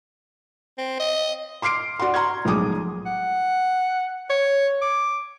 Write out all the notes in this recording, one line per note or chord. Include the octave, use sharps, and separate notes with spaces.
C4
D#5
C6 D6 F6 C7 D7
F#4 D5 F#5 C6
A#5 C6 C#6 F6 G#6
B1 A2 F3 G#3 D6 D#6
F#5
C#5
D6